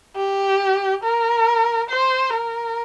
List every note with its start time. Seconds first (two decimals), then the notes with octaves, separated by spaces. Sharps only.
0.16 G4
1.04 A#4
1.90 C5
2.34 A#4